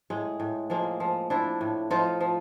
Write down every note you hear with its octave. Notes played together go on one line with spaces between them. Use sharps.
A2 G#3
A2
F3 G#3 A#3
F3
F3 D4 E4
A2
F3 D#4 F4
F3